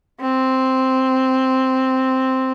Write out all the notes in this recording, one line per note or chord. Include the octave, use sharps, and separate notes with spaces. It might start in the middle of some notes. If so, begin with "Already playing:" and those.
C4